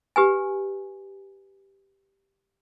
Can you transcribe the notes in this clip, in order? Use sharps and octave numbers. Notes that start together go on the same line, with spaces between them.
G4 B4 G#5